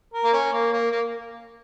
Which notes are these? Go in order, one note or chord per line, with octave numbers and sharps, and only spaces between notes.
A#4
A#3
C#4
A#3
A#3
A#3